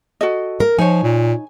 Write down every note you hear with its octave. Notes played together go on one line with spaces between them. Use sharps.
F#4 A4 D#5
A#4
F3 D#4 C#5 G#5
A#2